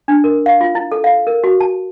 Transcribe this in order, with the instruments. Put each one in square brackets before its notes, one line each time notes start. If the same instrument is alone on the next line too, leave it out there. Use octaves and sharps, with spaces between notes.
[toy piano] D4
A#4
F5
F4
E4
A4
F5
A#4
F#4
A5